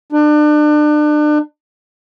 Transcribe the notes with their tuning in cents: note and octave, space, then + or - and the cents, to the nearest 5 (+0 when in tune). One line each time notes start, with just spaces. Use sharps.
D4 +35